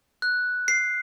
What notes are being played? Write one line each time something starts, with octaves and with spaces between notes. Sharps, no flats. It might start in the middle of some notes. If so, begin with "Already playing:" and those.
F#6
C7